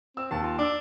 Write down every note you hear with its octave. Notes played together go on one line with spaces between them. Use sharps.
C4 E6
D#2 A5
F4
D4 D6 E6